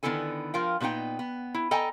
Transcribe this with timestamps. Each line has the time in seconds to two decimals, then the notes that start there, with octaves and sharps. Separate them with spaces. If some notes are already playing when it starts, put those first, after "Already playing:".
0.03 D3 D#3 B3 E4 A4 G#5
0.54 F3 F4 A#4 F5 G5
0.80 A#2 C#3 B3 D#4 G5
1.19 B3
1.54 E4
1.71 A4 D#5 G5 G#5 A#5